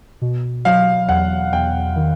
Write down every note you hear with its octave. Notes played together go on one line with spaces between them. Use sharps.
B2
F#3 F5
E2 F#5
E2 G5
D#3